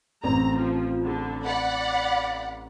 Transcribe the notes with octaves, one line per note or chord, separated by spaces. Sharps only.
A1 C4 A#5
F3
D3
D5 F#5 B5